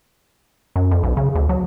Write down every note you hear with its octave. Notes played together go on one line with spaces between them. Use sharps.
F#2
F2
B1
C#3
D2
F#3